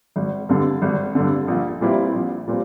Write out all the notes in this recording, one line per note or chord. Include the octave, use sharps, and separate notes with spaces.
G#1
G2 D3
G#1
G2 D3
A#1
A#2 G3 C4 E4
A#1
A#2 G3 C4